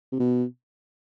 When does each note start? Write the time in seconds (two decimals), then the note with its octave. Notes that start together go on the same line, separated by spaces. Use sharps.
0.12 C3
0.20 B2